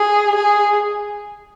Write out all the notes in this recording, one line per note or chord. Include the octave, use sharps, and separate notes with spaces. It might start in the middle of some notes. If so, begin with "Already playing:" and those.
Already playing: G#4
G#4